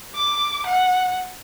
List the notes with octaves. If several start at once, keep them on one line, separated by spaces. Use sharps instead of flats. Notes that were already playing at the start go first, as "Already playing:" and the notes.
D6
F#5